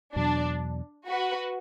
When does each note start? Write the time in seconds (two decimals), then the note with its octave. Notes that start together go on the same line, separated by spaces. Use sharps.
0.15 E2 B2 F#3 D4
1.07 F#4 B4